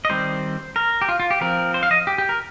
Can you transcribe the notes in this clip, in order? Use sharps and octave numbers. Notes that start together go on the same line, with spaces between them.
D#5
D#3 G3 C4 C5
A#4
G4
F4
F4
G4
F3 C4 A#4
C5
F5
D#5
G4
G4
A#4